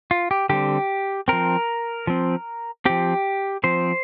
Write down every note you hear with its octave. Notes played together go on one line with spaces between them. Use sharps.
F4
G4
D3 G3 C4 G4
F3 C4 A#4
F3 C4
F3 C4 G4
F3 C4 C5